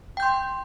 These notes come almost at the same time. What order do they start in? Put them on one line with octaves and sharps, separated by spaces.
G5 G6 C6